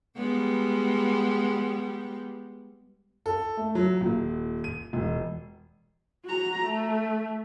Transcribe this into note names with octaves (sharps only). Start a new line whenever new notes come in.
G3 G#3 B3
A4
A3
F#3
D#1
D#7
E1
F#4 A#5
A3